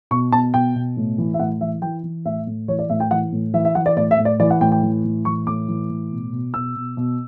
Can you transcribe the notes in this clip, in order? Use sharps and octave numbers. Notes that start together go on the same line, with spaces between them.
B2 C#6
B2 A5
B2 G5
B2
A2
E3
E5
A2 F#5
E3 E5
E3 G5
E3
A2 E5
A2
E3 C#5
D5
A2 E5
G5
E3 F#5
A2
E3 E5
E5
E3 F#5
D5
A2 D5
E5
A2
D5
E3 D5
F#5
A2 G5
G5
E3
A2
E3 C#6
A2 D6
E3
A2
B2
B2
B2 E6
B2
B2